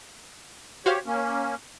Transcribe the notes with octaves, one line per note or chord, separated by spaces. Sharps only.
F#4 G4 C5 C#5 F5
A#3 C#4